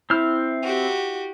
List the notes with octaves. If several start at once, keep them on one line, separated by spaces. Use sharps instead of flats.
C4 E4 F6
F#4 G4